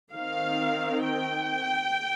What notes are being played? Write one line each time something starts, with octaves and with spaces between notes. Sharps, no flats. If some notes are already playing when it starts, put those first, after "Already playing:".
D#3 C4 F5
G5